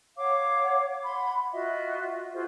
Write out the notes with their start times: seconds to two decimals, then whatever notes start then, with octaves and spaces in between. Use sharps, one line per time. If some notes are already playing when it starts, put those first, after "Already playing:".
0.17 C#5 F5 F#5 D6
1.03 F#5 B5 C6
1.52 F4 F#4 D#5 E5
2.32 F4 F#4 G#4 C5